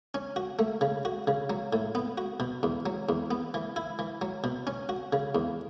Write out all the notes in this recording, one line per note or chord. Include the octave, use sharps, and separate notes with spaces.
C#4
F#4
A3
C#3
F#4
C#3
F#3
A2
B3
F#4
B2
E2
F#3
E2
B3
E3
E4
E3
F#3
B2
C#4
F#4
C#3
E2